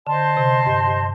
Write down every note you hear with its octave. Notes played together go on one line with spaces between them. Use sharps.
D3 C5 D#5 A5 C6
C3
G2
G2